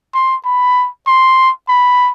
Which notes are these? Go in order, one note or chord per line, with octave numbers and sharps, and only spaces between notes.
C6
B5
C6
B5